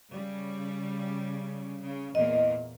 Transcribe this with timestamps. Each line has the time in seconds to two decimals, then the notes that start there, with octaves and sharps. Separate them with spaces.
0.13 C#3 G3
1.80 C#3
2.15 E2 A#2 A#3 D#5